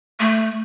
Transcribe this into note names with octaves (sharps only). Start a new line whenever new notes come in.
A3